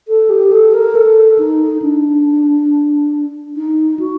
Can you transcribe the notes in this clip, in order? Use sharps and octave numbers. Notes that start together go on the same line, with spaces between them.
A4
G4
A4
A#4
A4
D#4
D4
D#4
F#4